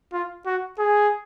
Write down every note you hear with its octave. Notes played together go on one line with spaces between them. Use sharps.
F4
F#4
G#4